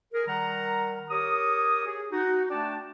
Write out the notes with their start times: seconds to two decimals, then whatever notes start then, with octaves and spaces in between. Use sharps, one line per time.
0.13 G#4 A#4
0.27 D#3 G3 A#4 F#5 A#5
1.10 G4 A#4 C#5 D#6
1.87 G#4
2.12 D#4 F#4
2.50 A3 D4 D5 G5 A5